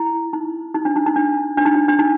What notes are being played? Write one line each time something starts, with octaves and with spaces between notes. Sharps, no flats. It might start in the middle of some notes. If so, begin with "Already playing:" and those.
Already playing: E4
D#4
D#4
D4
D#4
D#4
D4
D4
D#4
D4
D4
D#4